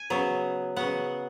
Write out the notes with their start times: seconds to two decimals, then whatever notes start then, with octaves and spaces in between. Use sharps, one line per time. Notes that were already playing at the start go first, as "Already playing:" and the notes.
Already playing: G#5
0.10 C#3 F#3 B3
0.76 C#3 F#3 B3 F#5